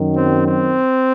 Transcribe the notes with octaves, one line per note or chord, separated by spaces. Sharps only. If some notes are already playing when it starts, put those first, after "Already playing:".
Already playing: F#2 D#3 F#3
C4
C4